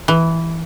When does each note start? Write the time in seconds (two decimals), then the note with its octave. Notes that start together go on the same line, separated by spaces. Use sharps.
0.08 E3